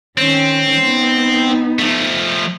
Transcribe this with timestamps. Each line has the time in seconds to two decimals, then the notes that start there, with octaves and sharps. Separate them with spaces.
0.18 D#3 C4 C#4
0.81 B3 D#4
1.79 F3 A3